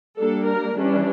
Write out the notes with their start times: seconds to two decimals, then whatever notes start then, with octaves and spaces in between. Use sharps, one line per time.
0.19 G3 A#3 D4 A4
0.48 A#4
0.77 E3 G3 C#4 D4